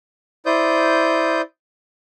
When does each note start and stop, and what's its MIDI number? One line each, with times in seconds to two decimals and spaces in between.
0.46 1.41 64
0.46 1.41 72
0.46 1.41 74
0.46 1.41 87
0.46 1.41 91